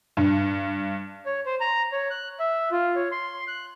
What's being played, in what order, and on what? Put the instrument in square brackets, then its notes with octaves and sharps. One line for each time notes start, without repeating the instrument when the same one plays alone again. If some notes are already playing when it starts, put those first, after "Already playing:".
[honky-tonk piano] G2
[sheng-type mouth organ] C#5
C5
A#5
C#5
F#6
E5
F4
C#5
C6
F#6